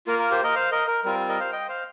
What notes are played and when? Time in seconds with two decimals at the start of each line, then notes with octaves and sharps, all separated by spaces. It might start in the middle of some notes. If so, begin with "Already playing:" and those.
0.07 A#3 F4 A#4
0.19 A#4
0.31 G4 C5
0.44 A#4 D#5
0.55 C5 F5
0.72 A#4 D#5
0.88 A#4
1.04 G3 C4 F4 A#4
1.29 A#4 D#5
1.40 C5 F5
1.52 D#5 G5
1.68 C5 F5